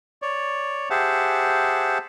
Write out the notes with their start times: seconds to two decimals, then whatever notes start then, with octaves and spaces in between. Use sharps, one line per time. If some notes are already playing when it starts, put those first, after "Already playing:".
0.22 C#5 D5
0.90 G4 G#4 C5 E5 F#5 A5